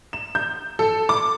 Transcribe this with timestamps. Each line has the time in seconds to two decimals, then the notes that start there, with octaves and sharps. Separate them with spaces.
0.13 E7
0.35 G6
0.79 A4
1.09 D6